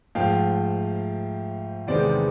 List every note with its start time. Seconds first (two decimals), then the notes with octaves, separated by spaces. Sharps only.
0.15 G#2 F3 A3 F5 G5
1.87 E2 C3 D#3 G#3 B3 C5 D5